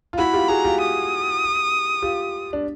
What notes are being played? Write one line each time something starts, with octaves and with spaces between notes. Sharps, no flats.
F4
E4 F#4 B5
F4 G4
F#4 G#4 A#5
F4 G4
D#6
F4 G4
D4